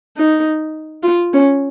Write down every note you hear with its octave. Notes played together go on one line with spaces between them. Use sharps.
D#4
F4
C#4